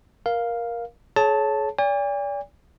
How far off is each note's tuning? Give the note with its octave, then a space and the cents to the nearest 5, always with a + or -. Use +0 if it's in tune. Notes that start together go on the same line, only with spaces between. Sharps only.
A#4 +15 F5 +0
G#4 +40 C#5 +0 A5 +0
D5 -35 G#5 -45